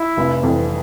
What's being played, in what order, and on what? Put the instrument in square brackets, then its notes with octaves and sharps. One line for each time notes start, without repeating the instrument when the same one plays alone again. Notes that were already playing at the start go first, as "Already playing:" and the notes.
Already playing: [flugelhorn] E4
[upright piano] F1
F2 E3